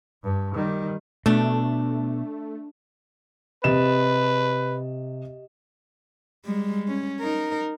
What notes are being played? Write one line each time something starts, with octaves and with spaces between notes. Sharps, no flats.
G2
D#3 G3
B2 A3 D4
C3 G4 B4 D#5 E7
G3 G#3
C#4
D#4 A#4